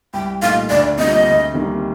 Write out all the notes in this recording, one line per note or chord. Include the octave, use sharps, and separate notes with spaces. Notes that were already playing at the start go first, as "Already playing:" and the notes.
C2 G5
A#2 A3 D#4 F5
D2 D5
C3 G3 A#3 F4 D#5
D2
C3 D#3 G3 A#3